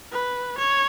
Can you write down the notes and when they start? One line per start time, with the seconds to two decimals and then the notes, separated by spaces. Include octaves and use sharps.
0.12 B4
0.58 C#5